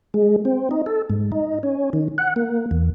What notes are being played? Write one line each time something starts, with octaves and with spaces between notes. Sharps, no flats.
G#3
C4
D#4
A4
G#2
D#4
C#4
D#3
F#5
A#3
E2